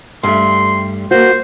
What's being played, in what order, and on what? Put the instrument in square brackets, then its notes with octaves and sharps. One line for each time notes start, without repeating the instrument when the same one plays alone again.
[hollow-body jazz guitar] G2 A3 [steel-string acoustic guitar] G3 [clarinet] C6
[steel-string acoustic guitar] A#3 F#4 [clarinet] C5